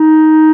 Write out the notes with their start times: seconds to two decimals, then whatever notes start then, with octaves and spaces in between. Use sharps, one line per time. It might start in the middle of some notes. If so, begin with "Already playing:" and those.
Already playing: D#4